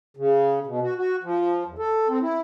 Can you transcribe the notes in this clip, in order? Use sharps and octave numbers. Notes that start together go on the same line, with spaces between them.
C#3
B2
F#4
F#4
F3
E2
A4
C4
E4